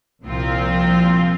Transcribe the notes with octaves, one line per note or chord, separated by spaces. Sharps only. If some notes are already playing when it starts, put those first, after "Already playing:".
C2 A#2 F3 C4 F4